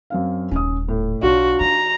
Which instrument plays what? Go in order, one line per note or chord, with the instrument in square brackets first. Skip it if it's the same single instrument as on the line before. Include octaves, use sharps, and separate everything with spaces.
[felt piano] F#2 C4 F5
[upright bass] D#1 D#4 [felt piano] C#4 D#6
[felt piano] A2
[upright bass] B1 [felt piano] D4 F4 C#5 [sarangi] F#4
[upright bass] D#3 [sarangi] A#5